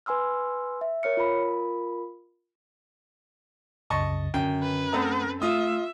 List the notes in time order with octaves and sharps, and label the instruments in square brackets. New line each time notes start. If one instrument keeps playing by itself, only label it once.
[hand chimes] B4 G#5 C6 E6 F6
E5
A#4 C#5 F6 C#7
F4 A#4 B5
[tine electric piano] C2 F#2 C#3 [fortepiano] D#5 A5 C#6
[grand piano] F#2 [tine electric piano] D3 [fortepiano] G5
[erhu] B4
[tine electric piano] A3 F#5 D#6 [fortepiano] C4 A4 A#5
[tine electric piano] A3 [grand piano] F4 D#6 [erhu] E5